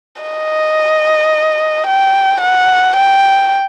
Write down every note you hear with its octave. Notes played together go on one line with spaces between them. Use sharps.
D#5
G5
F#5
G5